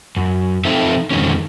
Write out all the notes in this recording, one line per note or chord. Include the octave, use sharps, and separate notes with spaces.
F#2
F3 C4 D#4 F4 A4 E5
F2 G#2 D3 D#3 G#3 C#4